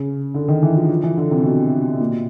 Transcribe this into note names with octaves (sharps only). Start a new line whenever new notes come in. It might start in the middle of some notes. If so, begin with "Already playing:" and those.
Already playing: C#3
D3
D#3
E3
F3
F3
E3
D3
C3
B2
A#2